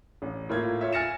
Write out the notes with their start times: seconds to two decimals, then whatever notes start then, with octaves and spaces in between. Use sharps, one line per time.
0.22 A1
0.49 A2 A#3 F4 G#6
0.81 F4 C#5 E5
0.93 G#5 F6 A6 A#6 C#7 E7